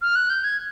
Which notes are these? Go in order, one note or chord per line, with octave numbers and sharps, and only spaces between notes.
F6
F#6
G6
G#6